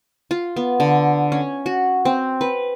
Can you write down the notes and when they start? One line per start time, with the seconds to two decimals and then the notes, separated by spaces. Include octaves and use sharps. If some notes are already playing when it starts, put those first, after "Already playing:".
0.31 F4
0.56 B3
0.80 D3
1.32 C#4
1.66 F#4
2.05 C4
2.41 B4